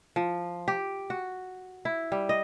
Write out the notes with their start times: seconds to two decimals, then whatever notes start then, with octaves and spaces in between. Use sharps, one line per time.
0.16 F3
0.68 G4
1.10 F#4
1.85 E4
2.12 G3
2.29 D#5